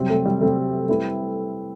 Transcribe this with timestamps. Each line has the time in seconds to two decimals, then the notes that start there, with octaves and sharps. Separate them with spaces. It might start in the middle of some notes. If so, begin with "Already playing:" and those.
Already playing: C3 F#3 G3 C4
0.09 A3
0.26 G3
0.40 C3 F#3 A3 C4
0.89 G3 A3 C4 E4 B4